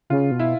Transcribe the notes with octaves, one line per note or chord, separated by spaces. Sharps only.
C#3 F4
B2
E4